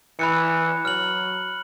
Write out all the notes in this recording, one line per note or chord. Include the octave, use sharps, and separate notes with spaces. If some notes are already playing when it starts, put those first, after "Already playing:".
E3 B5 F#6 C#7
F#3 F6 F#7